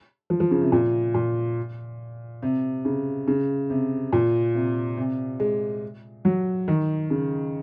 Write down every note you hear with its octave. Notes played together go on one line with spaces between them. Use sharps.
F3
F3
C#3
C3
A#2
A#2
C3
C#3
C#3
C3
A#2
C3
C3
G#3
F#3
D#3
C#3